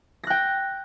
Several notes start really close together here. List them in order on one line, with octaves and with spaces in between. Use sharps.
A#6 F#6 G5